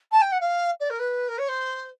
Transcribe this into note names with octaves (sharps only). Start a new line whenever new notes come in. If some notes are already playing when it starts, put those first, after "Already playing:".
A5
G5
F#5
F5
D5
A#4
B4
A#4
C#5
C5